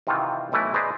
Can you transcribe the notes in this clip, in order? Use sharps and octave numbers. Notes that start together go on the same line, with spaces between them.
C3 D#3 E3 C4 F4 F#4
B1 E3 A3 E4 B4
G#4 B4 C5 D5 D#5 A#5